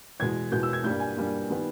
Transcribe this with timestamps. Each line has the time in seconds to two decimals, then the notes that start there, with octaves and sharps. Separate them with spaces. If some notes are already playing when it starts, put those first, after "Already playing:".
0.20 E2 B2 G#3 G#6
0.52 E2 B2 G#3 G6
0.63 E6
0.73 G#6
0.84 G2 G3 A#3 G6
1.00 G#5
1.17 G2 G3 A#3
1.49 D#3 G3 B3